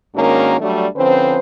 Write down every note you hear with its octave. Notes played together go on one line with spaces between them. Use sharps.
G#2 D#3 A#3 C#4 D4 F#4
F#3 G3 A3 D4
D3 F3 C4 C#4 B4 C5